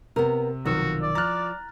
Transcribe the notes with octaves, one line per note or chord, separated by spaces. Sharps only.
C3 B3 A#4
B1 D#3 F3 F#4 E6
D5
F3 A#5 F6 F#6 A6